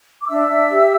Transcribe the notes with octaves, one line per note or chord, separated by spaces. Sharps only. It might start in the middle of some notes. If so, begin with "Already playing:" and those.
D6
D4 E5 E6
D4
G4